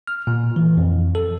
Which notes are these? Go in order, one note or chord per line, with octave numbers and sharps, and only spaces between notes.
F6
A#2
E3
F2
A4